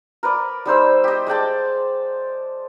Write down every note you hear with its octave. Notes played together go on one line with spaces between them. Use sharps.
A#4 B4 D5
G3 D#4 C5 E6
G4 D#5
G#3 D5 G5 A5